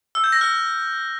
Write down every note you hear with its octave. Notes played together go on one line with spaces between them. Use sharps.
E6
G6
A#6
F6